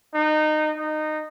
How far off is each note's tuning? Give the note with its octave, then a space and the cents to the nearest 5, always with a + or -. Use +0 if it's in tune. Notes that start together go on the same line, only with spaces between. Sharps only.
D#4 -20
D#4 -20